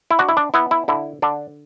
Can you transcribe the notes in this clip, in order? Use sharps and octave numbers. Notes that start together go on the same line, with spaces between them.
E4
D4 F#4
E4
D4
B3 E4
E4
D3 E4
D3 D4